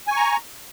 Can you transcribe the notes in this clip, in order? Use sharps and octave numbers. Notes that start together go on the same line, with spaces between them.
G#5 A#5 C#6